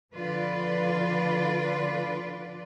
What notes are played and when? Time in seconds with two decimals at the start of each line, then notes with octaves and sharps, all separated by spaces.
0.15 D3 F3 F4 B4 D5